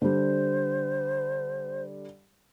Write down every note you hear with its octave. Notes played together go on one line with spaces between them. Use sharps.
D3 G3 C5